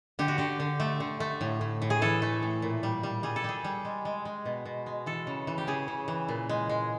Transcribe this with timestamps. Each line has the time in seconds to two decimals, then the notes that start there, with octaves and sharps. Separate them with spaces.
0.19 D3 G4
0.28 F#4
0.38 D3 G4
0.60 D3
0.80 A3
1.00 D3
1.20 A3
1.41 A2
1.61 A2
1.82 A2
1.90 G#4
2.02 E3 A4
2.22 A3
2.43 A2
2.62 A#2
2.83 G3
3.03 G3
3.23 G3 G#4
3.36 A4
3.44 G3 G#4
3.64 G3
3.85 G#3
4.05 G#3
4.25 G#3
4.45 B2
4.65 B2
4.86 G#3
5.06 E3 A4
5.27 C#3
5.47 E3
5.58 G4
5.67 C#3 G#4
5.88 C#3
6.08 E3
6.28 A#2
6.49 G#3
6.69 G#3